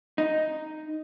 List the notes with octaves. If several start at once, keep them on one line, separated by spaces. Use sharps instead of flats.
D#4